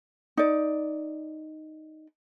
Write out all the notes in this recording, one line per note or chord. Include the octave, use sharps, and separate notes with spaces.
D#4 D5